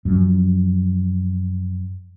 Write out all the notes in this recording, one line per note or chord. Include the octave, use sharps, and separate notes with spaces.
F#2 F3